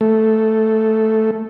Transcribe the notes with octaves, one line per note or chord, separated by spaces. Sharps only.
A3